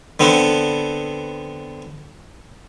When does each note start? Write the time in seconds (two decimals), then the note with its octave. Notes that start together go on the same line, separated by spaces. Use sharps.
0.20 D3 B3 C4 D4